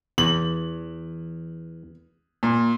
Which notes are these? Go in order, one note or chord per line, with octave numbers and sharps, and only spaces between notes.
E2 F#7
A#2